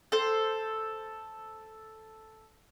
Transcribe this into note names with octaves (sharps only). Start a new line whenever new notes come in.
A4 C5